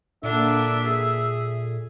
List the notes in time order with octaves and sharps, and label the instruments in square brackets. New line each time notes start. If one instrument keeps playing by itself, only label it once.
[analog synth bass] A#2 [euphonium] D3 [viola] A#3 D4 [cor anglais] E5
[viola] G#4 [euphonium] A4